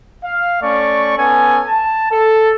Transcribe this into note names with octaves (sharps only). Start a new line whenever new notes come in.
F5
A3 C#4 D5 C#6
B3 C#4 A4 G#5
A5
A4